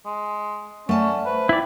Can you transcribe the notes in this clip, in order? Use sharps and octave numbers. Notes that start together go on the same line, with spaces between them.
G#3
A3 C#4 D5 F#5 A5
B4 C5
E4 D5 G5